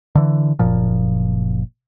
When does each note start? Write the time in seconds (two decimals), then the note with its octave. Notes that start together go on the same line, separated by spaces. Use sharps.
0.15 D3 E3
0.59 F#1 A#2 F3